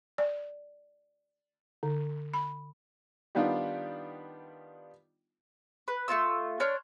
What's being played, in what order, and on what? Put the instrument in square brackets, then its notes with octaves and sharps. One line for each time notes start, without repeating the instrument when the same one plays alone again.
[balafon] D5
D3
B5
[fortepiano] D#3 G3 B3 D4 F4
[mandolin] B4
A3 D#4 F4 E6
D4 C#5 C6 F6